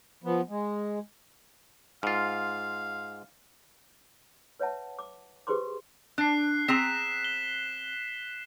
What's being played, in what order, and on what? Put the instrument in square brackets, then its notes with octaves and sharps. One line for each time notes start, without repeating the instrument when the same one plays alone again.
[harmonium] F3 B3
G#3
[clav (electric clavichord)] G#2 F4 [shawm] F5
[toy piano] B4 C#5 E5 F#5 A5
D6
G4 G#4 B4 C5 C6 D6
[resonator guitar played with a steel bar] D4 [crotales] F#6 C7
[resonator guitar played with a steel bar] C4 G#4 A#5 [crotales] B6 E7
[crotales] G7